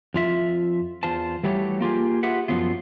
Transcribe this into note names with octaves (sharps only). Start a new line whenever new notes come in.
F2 F4 E5
E2 F4 C5 A5
E3 F#3 G3 A3 G4 C#5
A#3 F4 G4 G#4
F4 G4 G#4 B4 E5 F#5
F#2 F3 F#3 B3 F4